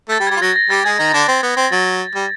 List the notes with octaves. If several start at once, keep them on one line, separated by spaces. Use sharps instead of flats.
A3 A4
A6
G3 G4
G#6
G3 G4
F4
F#3 F#4 A#6
A#6
G3 G4 A6
G#3 G#4 G#6
D#3 D#4
D3 D4
C4
B3
C4
F#3 A6
G3